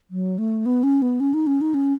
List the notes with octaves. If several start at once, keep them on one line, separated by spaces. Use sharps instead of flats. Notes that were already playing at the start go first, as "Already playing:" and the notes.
F#3
A3
B3
C#4
B3
C#4
D#4
C#4
D#4
C#4